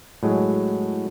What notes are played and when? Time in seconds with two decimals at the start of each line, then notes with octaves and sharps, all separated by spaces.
0.23 A2 F#3 G#3